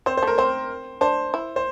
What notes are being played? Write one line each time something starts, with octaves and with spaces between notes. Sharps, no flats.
C4 C5
C5
A3 A#4
C4 C5
D4 C5
E4
C5